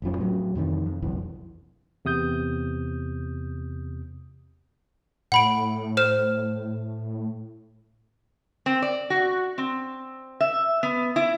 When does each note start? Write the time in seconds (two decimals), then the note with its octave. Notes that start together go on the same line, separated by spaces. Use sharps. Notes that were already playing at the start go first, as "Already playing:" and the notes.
0.02 F1 F#2 F3 C#4
0.17 A2 F#3
0.55 F2 C3 D#3 E3
0.86 F2
1.02 F#1 B1 F2 E3
2.05 E2 C3 D#6 G6
5.32 A2 F#5 B5 D7
5.97 C5 F6 E7
8.66 C4
8.82 D5
9.10 F#4
9.58 C4
10.41 E5
10.83 B3
11.16 E4